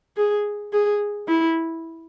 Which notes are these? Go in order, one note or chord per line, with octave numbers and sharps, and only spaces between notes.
G#4
G#4
E4